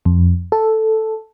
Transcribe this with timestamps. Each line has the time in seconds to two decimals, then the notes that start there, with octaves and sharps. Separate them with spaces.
0.05 F2
0.52 A4